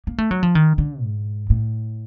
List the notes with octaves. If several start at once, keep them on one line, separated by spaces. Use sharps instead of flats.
A#3
A3
F#3
F3
D#3
D3
G#2
A2